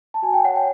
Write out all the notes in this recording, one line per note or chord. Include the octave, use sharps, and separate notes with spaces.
A5
F#4 G#5
G5
C#5 F#5
G5